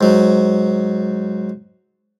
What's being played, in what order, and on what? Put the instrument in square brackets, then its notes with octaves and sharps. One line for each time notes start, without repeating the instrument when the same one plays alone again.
[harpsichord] G#2 F#3